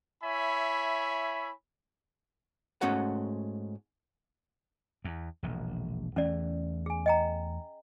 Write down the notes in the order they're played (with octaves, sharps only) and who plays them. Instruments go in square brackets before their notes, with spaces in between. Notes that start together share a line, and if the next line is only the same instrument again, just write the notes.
[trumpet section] E4 C#5 E5 G#5 B5
[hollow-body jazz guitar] G#2 A3 C#4 F#4 F#5
[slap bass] E2
E1 A#1
[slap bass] E2 E3 A3 [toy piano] C#4 D5
[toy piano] G#4 G#5
D#5 G5 A#5